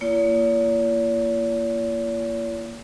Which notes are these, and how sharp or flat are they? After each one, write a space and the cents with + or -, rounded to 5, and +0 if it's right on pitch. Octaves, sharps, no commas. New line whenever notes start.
A#3 +0 F4 -45 C#5 +45